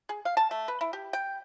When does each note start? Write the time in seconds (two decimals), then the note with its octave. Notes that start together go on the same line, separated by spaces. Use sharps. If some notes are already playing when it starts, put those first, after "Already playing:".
0.09 G#4
0.25 F5
0.37 A5
0.51 A3
0.68 B4
0.81 E4
0.93 G4
1.13 G5